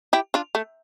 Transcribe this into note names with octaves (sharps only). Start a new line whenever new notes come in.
E4 G4
D4 F4
A3